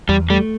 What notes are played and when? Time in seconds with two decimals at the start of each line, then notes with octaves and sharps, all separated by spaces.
0.09 E2 G3
0.30 G3 A3